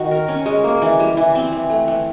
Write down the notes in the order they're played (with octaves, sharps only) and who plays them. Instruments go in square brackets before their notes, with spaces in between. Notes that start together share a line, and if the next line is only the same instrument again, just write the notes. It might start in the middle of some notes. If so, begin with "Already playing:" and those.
Already playing: [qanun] D#3 F#4
A#4
C#4
G#3
A#3
E3
G3
E3
C4
E3
A3
E3